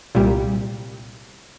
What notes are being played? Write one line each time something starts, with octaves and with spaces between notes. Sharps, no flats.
C2 A#2 G3